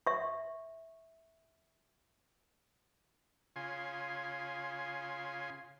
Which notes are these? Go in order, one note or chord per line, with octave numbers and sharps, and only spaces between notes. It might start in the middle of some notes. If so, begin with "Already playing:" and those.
E5 C#6
C#3 F4 G#5 C6